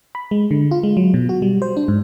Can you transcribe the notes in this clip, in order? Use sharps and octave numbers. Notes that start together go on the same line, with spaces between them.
B5
G#3
D3
F4
G#3
F#3
B2
F#4
G3
C5
D4
G#2